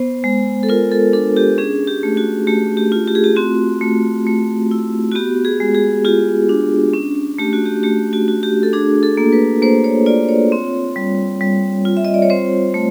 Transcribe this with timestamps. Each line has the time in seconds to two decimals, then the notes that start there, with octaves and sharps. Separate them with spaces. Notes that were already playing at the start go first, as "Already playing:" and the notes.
Already playing: B3 C5
0.24 G#3
0.63 A4
0.69 F4 A#4
0.92 A4
1.13 D4 A4
1.37 G4
1.58 C#4 G#4
1.87 G4
2.03 A3
2.17 F#4
2.47 A3 G4
2.77 G4
2.92 F4
3.07 G4
3.15 G#4
3.24 G4
3.36 C4 F#4
3.81 A3
4.27 A3
4.71 E4
5.12 F#4
5.15 B3 G4
5.45 G#4
5.60 G#3
5.74 G#4
6.05 F4 G4
6.49 D4
6.94 C#4
7.38 A3 G4
7.53 F#4
7.66 G4
7.83 A3 G4
8.13 F#4
8.28 F#4
8.43 G4
8.63 A4
8.73 D4 G#4
9.03 A4
9.17 A#3
9.33 B4
9.62 A#3 C5
9.84 C#5
10.06 F4 D5
10.29 C#5
10.52 C4
10.96 G3
11.41 G3
11.85 F4
11.97 E5
12.05 D#5
12.14 D5
12.22 C#5
12.30 C4 C5
12.74 A3